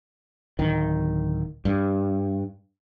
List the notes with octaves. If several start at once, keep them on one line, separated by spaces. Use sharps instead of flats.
D1 D#3
G2